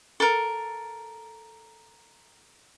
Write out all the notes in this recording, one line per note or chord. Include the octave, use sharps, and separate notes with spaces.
A4 A#4